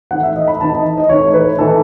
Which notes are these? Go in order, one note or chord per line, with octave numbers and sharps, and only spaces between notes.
E3 A3 D#4 F#5
E5
D#5
B5
E3 A3 D#4 A5
D#5
D#5
E3 A3 D#4 C#5
B4
E3 A3 D#4 A4